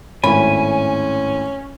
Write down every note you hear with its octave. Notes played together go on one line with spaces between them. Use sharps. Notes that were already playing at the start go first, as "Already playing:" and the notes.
G#1 A2 C#4 G#5 B5